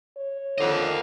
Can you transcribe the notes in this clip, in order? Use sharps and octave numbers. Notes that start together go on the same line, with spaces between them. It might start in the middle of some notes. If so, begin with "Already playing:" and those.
C#5
F2 D3 D#3 F3 D#5 F5